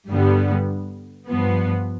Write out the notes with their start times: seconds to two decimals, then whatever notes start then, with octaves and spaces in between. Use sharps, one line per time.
0.10 G2 D3 G3 B3
1.28 G2 F3 B3